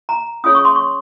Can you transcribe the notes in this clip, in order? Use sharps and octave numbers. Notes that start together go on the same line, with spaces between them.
A#5
C#4 F4 G#4 C#5 D#6
C#6
C6
C#6